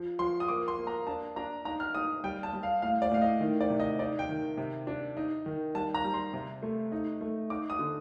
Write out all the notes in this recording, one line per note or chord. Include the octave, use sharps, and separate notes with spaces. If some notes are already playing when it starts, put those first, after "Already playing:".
Already playing: F3
F3 C6
D#6
A#3 D6
C6
A#3
A#5
D4 A5
D4 A#5
D#4 A#5
F6
D#4 D#6
G3 G5
A5
G3
F5
A2 F5
D5
A2 F5
D#5
D#3
D5
C3
D#5
D#4 D5
G5
D#3
C3
D4
D#4
D#3
G3 A5
A#5
G3
C6
C3
A3
D#4
A3
D#4 D6
D#6
D3